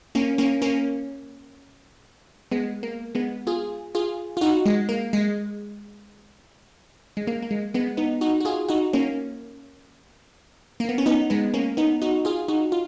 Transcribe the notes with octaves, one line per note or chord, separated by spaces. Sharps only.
A#3 C#4
A#3 C#4
A#3 C#4
G#3 B3
A#3
G#3 B3
F4 G#4
F4 G#4
F4
D#4 F#4
G#3
A#3
G#3
G#3
A#3
A#3
G#3
G#3 B3
B3 D#4
D#4 F#4
F#4
F4 G#4
D#4 F#4
A#3 C#4
A#3
B3
C#4
B3 D#4
G#3 B3
A#3 C#4
B3 D#4
D#4 F#4
F4 G#4
D#4 F#4
F4